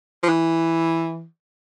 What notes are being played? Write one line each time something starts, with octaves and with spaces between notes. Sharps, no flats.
F3
E3